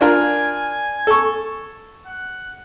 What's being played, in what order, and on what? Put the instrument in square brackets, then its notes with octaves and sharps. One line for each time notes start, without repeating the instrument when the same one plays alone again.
[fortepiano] D4 F4 A#4 [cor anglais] G#5
[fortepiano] A4 C#6
[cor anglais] F#5